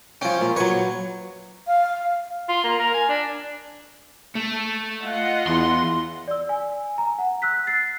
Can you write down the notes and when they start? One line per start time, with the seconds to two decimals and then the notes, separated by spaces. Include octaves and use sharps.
0.21 F3 C#4 G5
0.41 A#2
0.56 F#3 B4 C#5
1.67 F5
2.49 F4
2.64 A#3
2.79 A#4
2.94 G#5
3.09 D4
4.35 A3
5.03 F4 D#5 F#5
5.47 E2 C6
6.28 D5 E6
6.49 G#5
6.98 A#5
7.18 F#5
7.42 E6 F#6 B6
7.67 A6 C7